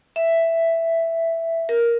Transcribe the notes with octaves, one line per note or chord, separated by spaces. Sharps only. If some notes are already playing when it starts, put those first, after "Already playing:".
E5
A#4